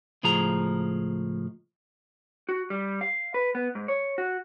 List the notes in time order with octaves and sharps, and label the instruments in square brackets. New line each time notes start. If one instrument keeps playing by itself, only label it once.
[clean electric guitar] C#2 A2 F3 G#4 A#5
F#4
G3
F5
B4
B3
G#2
C#5
F#4